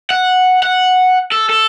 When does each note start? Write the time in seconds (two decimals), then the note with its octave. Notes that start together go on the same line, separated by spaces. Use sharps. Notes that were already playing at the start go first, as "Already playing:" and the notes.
0.11 F#5
0.63 F#5
1.32 A4
1.50 A4